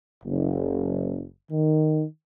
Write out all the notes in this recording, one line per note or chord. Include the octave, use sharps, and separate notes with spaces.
F#1
D#3